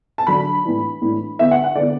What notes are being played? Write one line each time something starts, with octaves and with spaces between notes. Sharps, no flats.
A5
D3 F#3 D4 B5
A2 E3 D4
A2 E3 D4
D3 B3 E4 E5
F#5
F#5
D3 B3 E4 D5